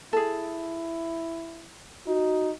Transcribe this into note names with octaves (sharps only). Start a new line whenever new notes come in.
E4 G#4 A4
D#4 F#4